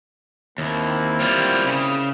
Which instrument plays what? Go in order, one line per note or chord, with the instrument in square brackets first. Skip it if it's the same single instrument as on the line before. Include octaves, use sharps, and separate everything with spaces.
[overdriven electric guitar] D#2 [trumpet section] A#3 C4 E4
[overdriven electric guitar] G3 F4
C#3